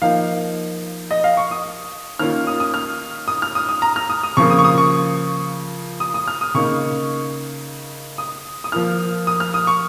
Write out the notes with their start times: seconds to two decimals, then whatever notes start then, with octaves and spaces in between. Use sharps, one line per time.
0.02 F3 A#3 D#4 F5
1.11 D#5
1.24 F5
1.37 C#6
1.51 D#6
2.19 D#3 A#3 C#4 F4 F6
2.47 D#6
2.60 D#6
2.74 F6
3.28 D#6
3.42 F6
3.55 D#6
3.69 D#6
3.82 A#5
3.96 F6
4.09 D#6
4.23 D#6
4.37 C#3 F3 A#3 F4 C#6
4.50 D#6
4.59 C#6
4.64 D#6
4.78 C#6
6.00 D#6
6.14 D#6
6.28 F6
6.41 D#6
6.54 C#3 A#3 D#4 C#6
8.18 D#6
8.64 D#6
8.72 F3 A#3 F4 F6
9.27 D#6
9.40 F6
9.54 D#6
9.67 C#6